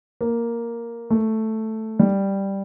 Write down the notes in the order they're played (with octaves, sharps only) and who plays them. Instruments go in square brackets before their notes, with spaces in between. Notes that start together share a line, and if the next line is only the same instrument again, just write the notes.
[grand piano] A#3
A3
G3